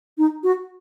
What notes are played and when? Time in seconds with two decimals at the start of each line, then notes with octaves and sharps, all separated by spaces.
0.18 D#4
0.43 F#4